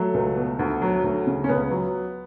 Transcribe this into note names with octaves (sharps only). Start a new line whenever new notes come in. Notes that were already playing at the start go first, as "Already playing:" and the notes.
Already playing: F#3 A3
C#2
B2
D2
F#3
D2
C#3
C#4
C#2 B3
F#3